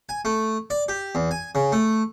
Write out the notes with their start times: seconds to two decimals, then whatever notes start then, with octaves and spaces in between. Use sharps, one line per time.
0.09 G#5
0.25 A3
0.70 D5
0.88 G4
1.15 E2
1.31 G#5
1.55 C#3
1.72 A3